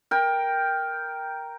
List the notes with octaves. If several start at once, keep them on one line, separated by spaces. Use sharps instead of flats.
A#4 G5